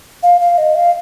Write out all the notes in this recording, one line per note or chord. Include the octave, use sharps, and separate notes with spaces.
F5
F5
D#5
F5